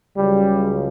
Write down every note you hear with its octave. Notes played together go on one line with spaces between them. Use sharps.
C#2 C#3 F#3 G3